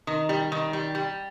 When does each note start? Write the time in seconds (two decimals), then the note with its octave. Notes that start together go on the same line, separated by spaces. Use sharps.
0.07 D#3
0.29 G3
0.52 D#3
0.73 G3
0.95 G3